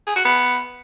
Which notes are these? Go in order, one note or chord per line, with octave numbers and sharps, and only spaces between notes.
G#4
F#4
B3